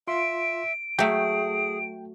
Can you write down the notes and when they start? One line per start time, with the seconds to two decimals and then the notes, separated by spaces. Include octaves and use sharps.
0.07 F4 E5 C6 D7
0.99 F#3 A3 G#4 G5